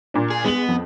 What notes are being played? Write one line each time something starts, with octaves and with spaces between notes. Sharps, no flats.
A#2 D4
G#4
G#3 B3 F#7
F2